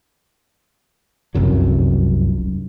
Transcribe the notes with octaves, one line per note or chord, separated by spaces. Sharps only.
F1 C2 F#2 F#3